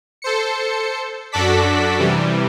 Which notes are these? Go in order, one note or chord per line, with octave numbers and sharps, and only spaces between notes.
A4 C5 C#7
F#2 D4 F#4 A4 D5 B6
C3 E3 G3